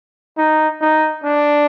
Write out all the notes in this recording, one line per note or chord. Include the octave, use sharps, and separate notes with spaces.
D#4
D#4
D4